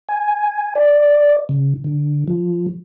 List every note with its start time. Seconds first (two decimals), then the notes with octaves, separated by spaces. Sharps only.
0.09 G#5
0.75 D5
1.49 C#3
1.84 D3
2.28 F3